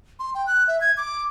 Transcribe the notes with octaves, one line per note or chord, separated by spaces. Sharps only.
C6
G5
F#6
E5
G#6
D6